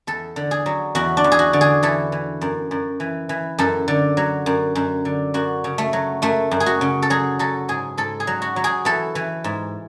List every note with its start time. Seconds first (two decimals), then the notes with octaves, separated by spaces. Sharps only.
0.07 E2 A4
0.36 D3
0.51 G#4
0.66 F#3
0.95 E2 F#4
1.17 D4
1.24 E2
1.32 G#4
1.39 F#4
1.53 D3
1.61 G#4
1.83 E3 A4
2.12 E3
2.41 F#2
2.71 F#2
3.00 E3
3.29 E3
3.58 F#2 A4
3.88 D3
4.17 F#3
4.46 F#2
4.75 F#2
5.05 D3
5.34 F#2 F#4
5.64 C#3
5.78 A3
5.93 F#3
6.22 F#2 A3
6.51 F#2
6.60 G#4
6.66 F#4
6.81 C#3
7.02 A4
7.10 F#3 G#4
7.39 F#3 A4
7.68 G#2 G#4
7.97 G#2 A4
8.20 G#4
8.27 F#3
8.42 F#4
8.56 F#3
8.64 G#4
8.85 E3 A4
9.15 E3
9.44 G#2